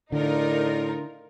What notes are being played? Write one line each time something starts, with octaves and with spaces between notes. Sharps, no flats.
A2 D3 D#4 F4 A#4 D5